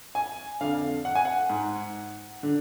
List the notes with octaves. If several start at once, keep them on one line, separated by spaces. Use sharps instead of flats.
G#5
F2 D3 F5
F#5
G#5
F#5
G#2
D3